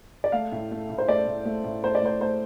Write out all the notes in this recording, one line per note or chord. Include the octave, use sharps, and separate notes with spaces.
D5
A3 F5
A2
A3
A2
C5
A3 D5
A2
A3
A2
A3 C5
D5
A2 C5
A3 C5